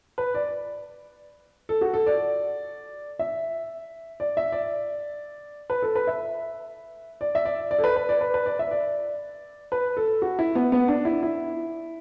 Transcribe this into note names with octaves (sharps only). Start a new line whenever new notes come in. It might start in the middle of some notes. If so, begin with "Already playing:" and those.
B4
D5
A4
F#4
A4
D5
E5
D5
E5
D5
B4
A4
B4
E5
D5
E5
D5
D5
A4
B4
B4
D5
B4
B4
D5
E5
D5
B4
A4
F#4
E4
B3
B3
D4
E4
E4